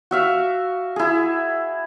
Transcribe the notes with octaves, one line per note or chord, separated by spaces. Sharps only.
F#4 E5 F5
E4 G#4